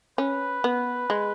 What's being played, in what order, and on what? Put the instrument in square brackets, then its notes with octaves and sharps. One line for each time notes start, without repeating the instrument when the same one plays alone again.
[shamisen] C#4 [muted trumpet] B4
[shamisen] B3
G#3